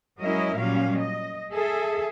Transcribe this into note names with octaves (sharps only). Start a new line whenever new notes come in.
F#3 G#3 C#4 E4 A#4 D#5
A#2 F#3 G3 C#4 F5
D#5
G#4 A4 E5